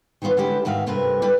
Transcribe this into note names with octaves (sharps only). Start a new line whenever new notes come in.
D#3 E3 B3 F4 C#5
D3 G#3 C#4 E4 G4 B4
G#2 D#3 F#4 E5 F5
G2 C3 A3 C4 A#4 B4
D3 G3 E4 B4 D5 G5